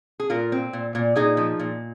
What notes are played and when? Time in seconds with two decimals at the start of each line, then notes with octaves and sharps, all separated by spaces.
0.20 G#4
0.30 A#2 F4 A#4
0.52 C4
0.73 A#2
0.95 A#2
1.16 A#2 D#4 G#4
1.37 F3
1.59 A#2